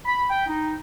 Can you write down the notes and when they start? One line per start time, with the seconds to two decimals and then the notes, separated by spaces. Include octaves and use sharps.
0.05 B5
0.30 G5
0.47 D#4